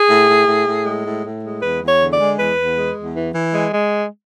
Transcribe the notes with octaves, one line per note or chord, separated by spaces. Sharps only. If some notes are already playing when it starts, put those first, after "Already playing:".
Already playing: G#4
A2
A2
A2
A2
G#3
A2
A2
G#3
E2 B4
E2
C#5
D3
D5
G#3
E2 B4
E2
G#3
E2
E3
E3
G#3
G#3